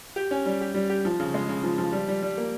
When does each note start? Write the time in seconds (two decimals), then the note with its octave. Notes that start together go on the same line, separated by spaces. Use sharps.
0.16 G4
0.31 C#4
0.46 G3
0.61 G4
0.74 G3
0.89 G4
1.05 F3
1.20 C#3
1.34 G#3
1.49 C#3
1.63 F3
1.78 F3
1.93 G3
2.08 G3
2.22 G3
2.37 A#3